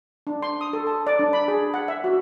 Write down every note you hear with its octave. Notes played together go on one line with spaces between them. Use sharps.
D4
C6
D#6
A4
A5
D5
D4
B5
G#4
F#5
E5
F#4